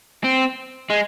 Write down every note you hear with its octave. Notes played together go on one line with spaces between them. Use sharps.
C4
G#3